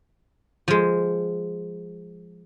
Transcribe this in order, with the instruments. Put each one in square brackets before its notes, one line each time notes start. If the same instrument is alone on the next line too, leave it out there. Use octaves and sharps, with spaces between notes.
[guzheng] F3 G#3